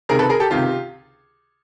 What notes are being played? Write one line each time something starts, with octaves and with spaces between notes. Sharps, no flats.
C#2 C3 D#3 G#4 A#4
A4 B4
G#4 A#4
G4 A4
C#2 C3 D#3 F4 G4